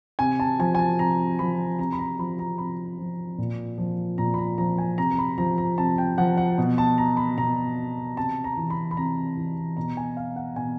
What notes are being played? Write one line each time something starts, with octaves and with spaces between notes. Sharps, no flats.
C3 G#5
A5
F3 G#5
G#5
A5
C3 A#5
F3 B5
C3 A#5
B5
A#5
F3 B5
A#5
C3 B5
F3
A#2
F3
A#2 A#5
B5
A#5
F3 A#5
G#5
C3 A#5
A#5
B5
F3 A#5
A#5
C3 A5
G5
F3 F#5
F#5
B2
A5
A#5
B5
B2 A#5
C3 A5
A#5
E3
B5
B5
C3 A#5
E3
B2 A#5
G#5
F5
F#5
B2 G#5